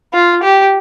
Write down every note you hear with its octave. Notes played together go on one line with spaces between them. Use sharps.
F4
G4